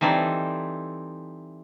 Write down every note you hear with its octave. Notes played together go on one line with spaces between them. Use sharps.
E3 G3 C4 D#4 A4